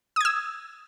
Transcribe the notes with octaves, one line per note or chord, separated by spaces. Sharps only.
D#6 E6 G#6